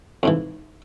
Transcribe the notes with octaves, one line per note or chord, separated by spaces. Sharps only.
F2 G#2 E3